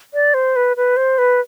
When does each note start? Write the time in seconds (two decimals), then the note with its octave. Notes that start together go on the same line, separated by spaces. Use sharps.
0.14 D5
0.34 C5
0.56 B4
0.77 B4
0.97 C5
1.18 B4